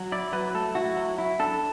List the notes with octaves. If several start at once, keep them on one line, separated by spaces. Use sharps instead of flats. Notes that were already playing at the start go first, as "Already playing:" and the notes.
Already playing: F#3
E4 D5
F#3 B4
A3 A4
E4 F#4
F#3
E4
D4 A4